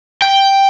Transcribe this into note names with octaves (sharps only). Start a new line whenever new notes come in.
G5